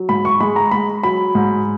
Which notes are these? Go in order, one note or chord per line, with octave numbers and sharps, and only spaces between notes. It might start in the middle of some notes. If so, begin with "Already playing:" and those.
Already playing: F#3
G#2 B5
C#6
G#3 B5
A#5
G#3 B5
F#3 B5
G#2